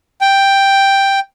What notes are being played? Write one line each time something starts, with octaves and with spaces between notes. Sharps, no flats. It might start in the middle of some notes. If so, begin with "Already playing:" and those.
G5